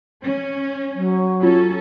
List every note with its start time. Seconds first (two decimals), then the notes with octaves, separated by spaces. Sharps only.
0.23 C#4
0.95 F#3
1.43 C#4 F4 A4